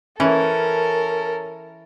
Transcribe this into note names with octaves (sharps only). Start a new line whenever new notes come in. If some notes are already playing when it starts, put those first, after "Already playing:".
E3 C#4 A4 A#4